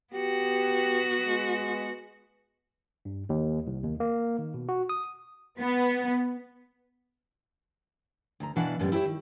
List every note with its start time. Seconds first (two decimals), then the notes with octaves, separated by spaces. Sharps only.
0.14 B3 F#4 G4
1.25 G#3
3.05 G2
3.29 D#2
3.67 C2
3.84 D#2
4.00 A#3
4.39 D#3
4.54 B2
4.69 F#4
4.89 D#6
5.59 B3
8.40 D2 A#5
8.56 B2 E3 D4 F5 F#5 A5
8.79 F#2 A2 D3 G3 B3
8.92 E4 G4 A4 C#5 E5
9.05 D#3